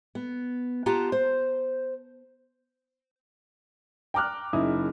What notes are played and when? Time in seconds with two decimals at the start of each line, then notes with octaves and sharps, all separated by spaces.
0.15 B3
0.86 B3 F4 G4 F#5 A5 A#5
1.12 C5
4.14 G5 A#5 D6 F6 F#6
4.53 F#1 C#3 D#4 E4 E5 D#6